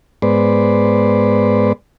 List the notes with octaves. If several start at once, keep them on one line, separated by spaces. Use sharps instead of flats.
G#2 G#3 B3 B4 C5 D5